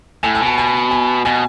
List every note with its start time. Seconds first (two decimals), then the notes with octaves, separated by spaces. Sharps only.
0.23 A2 G#5
0.35 G#5
0.41 B2
0.46 A5
0.58 G#5
0.91 G#5
1.25 B2 G#5